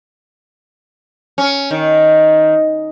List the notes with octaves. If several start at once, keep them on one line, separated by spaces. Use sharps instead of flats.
C#4
D#3